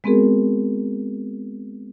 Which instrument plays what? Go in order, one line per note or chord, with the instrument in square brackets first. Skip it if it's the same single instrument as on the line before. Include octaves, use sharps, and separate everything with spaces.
[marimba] G#3 B3 C4 F#4 G#4 A#4